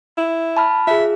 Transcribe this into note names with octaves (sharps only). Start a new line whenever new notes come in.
E4
A5 B5 F6
F4 G#4 E5